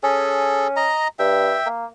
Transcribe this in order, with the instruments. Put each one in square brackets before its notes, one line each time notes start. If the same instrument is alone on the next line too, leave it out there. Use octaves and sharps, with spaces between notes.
[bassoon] C#4 [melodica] G#4 A4
[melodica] D#5 A#5
[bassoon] G2 [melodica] E5 G5
[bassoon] A#3